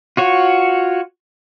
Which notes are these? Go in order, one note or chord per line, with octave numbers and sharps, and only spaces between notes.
F4 F#4 C#5